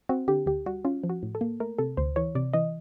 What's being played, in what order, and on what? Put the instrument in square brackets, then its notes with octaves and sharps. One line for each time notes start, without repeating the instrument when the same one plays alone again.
[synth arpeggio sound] C4 F#4
D3 G4
D2 G4
G3 F#4
C#4 F4
F3
F#4
A2
A4
A#3
A3 A#4
C3 A4
D2 C5
E3 C#5
C3 D5
E3 D#5